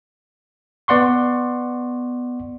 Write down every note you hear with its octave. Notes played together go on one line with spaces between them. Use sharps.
B3 D5 F#5 C6 C#6